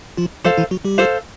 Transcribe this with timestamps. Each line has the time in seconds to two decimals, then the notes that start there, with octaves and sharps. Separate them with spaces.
0.17 F3 F4
0.44 F3 F4 A4 C5 F5
0.57 E3 E4
0.71 F#3 F#4
0.85 G3 G4
0.98 A4 C5 F5